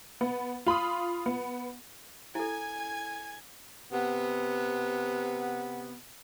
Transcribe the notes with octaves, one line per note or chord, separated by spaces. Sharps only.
B3
F4 B5 C6 D#6
B3
E4 A4 G#5 G#6
C3 B3